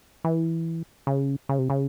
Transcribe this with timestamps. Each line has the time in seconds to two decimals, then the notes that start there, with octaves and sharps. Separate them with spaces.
0.24 E3
1.07 C#3
1.49 C#3
1.59 C3
1.70 C#3